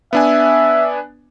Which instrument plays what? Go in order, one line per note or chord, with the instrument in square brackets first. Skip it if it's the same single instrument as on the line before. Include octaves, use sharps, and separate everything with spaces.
[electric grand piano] B3 D4 G#5 [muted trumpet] E5